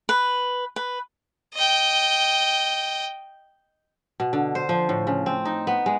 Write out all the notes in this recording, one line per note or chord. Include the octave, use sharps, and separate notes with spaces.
B4
B4
D#5 G5
B2
D3
C5
F3
A2
C#3
C4
D#4
B3
G#3